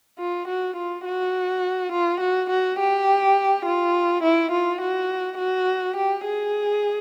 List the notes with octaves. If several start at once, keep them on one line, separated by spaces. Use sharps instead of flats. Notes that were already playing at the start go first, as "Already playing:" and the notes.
F4
F#4
F4
F#4
F4
F#4
F#4
G4
F4
E4
F4
F#4
F#4
G4
G#4